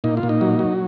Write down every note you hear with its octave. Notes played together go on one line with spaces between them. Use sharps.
A#2 D#4
F4
A#2
D#4
F#3
F#3